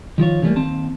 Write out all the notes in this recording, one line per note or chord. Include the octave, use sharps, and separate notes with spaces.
D#3 F3 F4 C#5
D3 E3 F#3 G3 A3 A#3
D#2 C4 A5